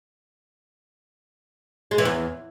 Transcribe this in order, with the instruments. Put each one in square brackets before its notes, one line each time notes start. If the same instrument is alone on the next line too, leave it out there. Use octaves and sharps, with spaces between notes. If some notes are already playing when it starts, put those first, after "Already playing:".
[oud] G#3
E3
E2